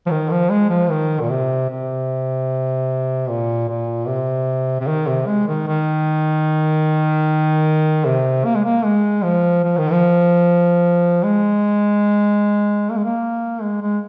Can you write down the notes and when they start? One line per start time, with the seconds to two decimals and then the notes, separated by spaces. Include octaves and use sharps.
0.06 F3
0.11 D#3
0.30 F3
0.50 G#3
0.70 F3
0.90 D#3
1.21 A#2
1.30 C3
1.69 C3
3.29 A#2
3.68 A#2
4.07 C3
4.80 C3
4.88 D#3
5.08 C3
5.27 G#3
5.48 D#3
5.67 D#3
8.05 C3
8.45 A#3
8.56 G#3
8.65 A#3
8.85 G#3
9.24 F3
9.64 F3
9.78 D#3
9.92 F3
11.24 G#3
12.90 A#3
12.97 G#3
13.04 A#3
13.62 G#3
13.82 G#3